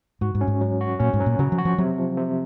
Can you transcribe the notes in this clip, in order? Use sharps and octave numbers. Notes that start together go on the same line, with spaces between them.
G#2 F#4
G#2
C#4
G#2
F#3
F#4
A#2 C#4
G#2
F#3
A#2
C#3 F#3
F3
F#4
F3
C3 F#3
F3
C3